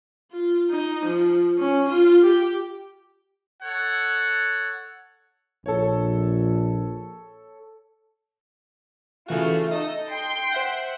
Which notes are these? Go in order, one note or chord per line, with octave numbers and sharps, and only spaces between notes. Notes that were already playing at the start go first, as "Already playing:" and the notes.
F4
D#4
F3
C#4
F4
G4
A4 C#5 F#5
A#1 A4 C#5
C#3 E3 A3 F4 F#4
D#4 A4 D#5
G5 C6
C5 E5 F#5